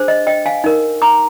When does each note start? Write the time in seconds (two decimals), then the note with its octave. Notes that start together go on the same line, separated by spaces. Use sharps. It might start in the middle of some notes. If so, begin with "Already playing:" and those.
Already playing: D4 G#4 C5
0.08 D#5
0.27 D#5 G5
0.46 F5 G#5
0.64 D#4 A#4
1.02 A#5 D6